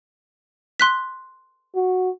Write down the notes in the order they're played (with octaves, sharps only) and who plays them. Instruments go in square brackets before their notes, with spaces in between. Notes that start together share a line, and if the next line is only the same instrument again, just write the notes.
[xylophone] C6 F#6 B6
[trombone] F#4